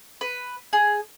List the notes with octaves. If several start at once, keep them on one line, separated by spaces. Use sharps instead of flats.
B4
G#4